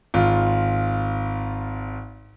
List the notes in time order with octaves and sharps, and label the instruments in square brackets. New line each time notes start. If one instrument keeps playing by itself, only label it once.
[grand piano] G#1 F4